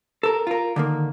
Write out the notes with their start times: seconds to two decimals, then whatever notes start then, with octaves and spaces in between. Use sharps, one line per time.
0.23 A4 A#4
0.47 F4 A#4
0.76 D3 D#3 A#3